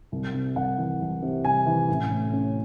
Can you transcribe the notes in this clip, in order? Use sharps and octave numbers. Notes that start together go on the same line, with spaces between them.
C2
C3
C2 F#5
E3
C2
C3
C2 G#5
E3
A1
A2
C#4